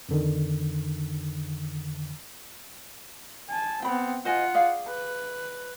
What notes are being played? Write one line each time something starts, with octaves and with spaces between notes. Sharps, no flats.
F2 D3 D#3
G#5 A5
B3 C4 G5 B5
F4 C5 D#5 F#5 G#5
G#4 D5 F5
B4